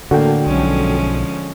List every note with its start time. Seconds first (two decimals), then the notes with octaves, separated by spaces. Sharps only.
0.11 A2 D3 A#3 F#4 A4 G5
0.47 B1 F3 G#3 C#4